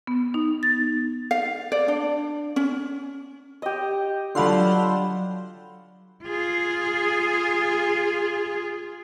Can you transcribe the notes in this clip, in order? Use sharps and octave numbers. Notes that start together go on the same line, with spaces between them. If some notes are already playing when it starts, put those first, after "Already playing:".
B3
D#4
A6
F5
D5
D4
C#4
G4 D#5
D3 F#3 F4 F5 A5 B5 C6
F4 G#4